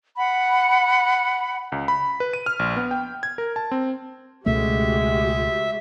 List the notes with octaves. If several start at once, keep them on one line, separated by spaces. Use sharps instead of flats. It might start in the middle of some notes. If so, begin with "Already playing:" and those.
F#5 B5
C#2
B5
B4
D#7
F6
A#1
B3
G5
G#6
A#4
A5
C4
C#2 B2 G#3 A3 F#4 G4 E5